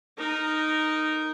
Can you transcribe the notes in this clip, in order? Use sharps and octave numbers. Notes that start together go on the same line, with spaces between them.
D#4 A#4